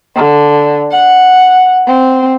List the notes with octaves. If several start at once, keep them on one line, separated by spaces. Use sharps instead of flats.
D3
F#5
C4